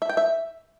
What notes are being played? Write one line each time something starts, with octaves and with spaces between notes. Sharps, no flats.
E5
G5
E5